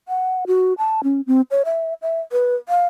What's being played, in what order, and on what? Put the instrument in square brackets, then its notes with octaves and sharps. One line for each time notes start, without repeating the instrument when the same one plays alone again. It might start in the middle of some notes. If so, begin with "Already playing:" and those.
[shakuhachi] F#5
F#4
A5
C#4
C4
C#5
E5
E5
B4
F5